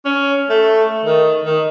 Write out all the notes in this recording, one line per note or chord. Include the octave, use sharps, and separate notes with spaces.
C#4
A3
D#3
D#3